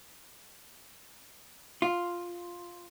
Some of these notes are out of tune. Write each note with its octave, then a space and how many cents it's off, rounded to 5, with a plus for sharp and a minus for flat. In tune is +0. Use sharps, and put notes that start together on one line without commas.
F4 +0